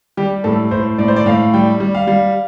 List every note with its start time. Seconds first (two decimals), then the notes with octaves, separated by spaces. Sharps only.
0.17 G3 G4
0.44 A2 A4
0.71 A2 C5
0.98 A2 D5
1.08 C5
1.16 D5
1.26 A2 F5
1.54 G3 G5
1.80 G3
1.95 F5
2.07 G3